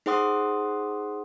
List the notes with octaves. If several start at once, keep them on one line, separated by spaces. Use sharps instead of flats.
D#4 G#4 C5 F#5 C6 D#6